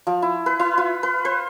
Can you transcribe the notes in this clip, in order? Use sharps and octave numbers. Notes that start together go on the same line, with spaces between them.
F3
E4
B4
E4
F4
B4
C5